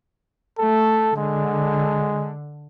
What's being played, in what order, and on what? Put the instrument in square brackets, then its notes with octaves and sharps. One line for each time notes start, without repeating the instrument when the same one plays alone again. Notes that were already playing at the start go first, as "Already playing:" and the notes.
[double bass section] A3 [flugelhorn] A4
[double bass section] D3 [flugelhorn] G#3